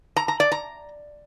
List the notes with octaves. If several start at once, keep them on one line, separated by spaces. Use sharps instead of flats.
A#5
A#5
D5
A#5